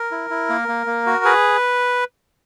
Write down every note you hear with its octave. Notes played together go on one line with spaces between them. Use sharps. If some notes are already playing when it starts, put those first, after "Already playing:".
Already playing: A#4
E4
E4
A#3
A#3
A#3
F#4
G#4 B4